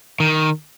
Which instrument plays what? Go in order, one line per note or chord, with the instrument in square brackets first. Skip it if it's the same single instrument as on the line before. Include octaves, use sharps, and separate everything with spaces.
[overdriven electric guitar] D#3